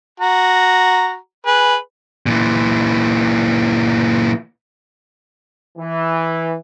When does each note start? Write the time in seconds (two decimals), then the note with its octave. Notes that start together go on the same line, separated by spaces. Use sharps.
0.20 F#4 A#5
1.46 G#4 B4
2.26 A#2 E3
5.78 E3